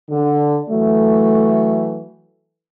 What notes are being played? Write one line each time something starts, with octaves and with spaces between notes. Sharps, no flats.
D3
E3 F#3 A3